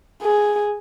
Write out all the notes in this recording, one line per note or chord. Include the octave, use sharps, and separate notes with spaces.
G#4